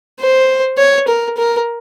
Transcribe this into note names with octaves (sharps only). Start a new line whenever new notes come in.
C5
C#5
A#4
A#4